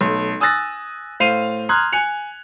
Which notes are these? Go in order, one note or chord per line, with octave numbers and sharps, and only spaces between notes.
B1 A3
G#5 D#6 E6 F#6 A6 A#6
A2 C5 F5 C7 D#7 F7
A#5 C6 D#6 F6 F#6 G#6
G#5 F#6 C#7 F7